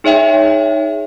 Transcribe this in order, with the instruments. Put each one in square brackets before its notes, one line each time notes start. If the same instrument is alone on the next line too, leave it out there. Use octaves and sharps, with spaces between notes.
[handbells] D#4 G#4 C#5 E5 G5